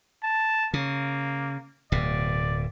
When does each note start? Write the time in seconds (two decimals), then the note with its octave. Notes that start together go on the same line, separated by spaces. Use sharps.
0.23 A5
0.74 C#3 A#3
1.92 D1 B2 D5